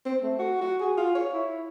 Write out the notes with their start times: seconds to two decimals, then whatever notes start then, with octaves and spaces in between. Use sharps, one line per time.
0.05 C4
0.23 A3
0.39 F#4
0.61 F#4
0.81 G#4
0.98 F4
1.15 C#5
1.34 E4